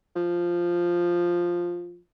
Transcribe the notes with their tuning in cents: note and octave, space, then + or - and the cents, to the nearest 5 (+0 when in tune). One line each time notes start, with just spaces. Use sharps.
F3 +0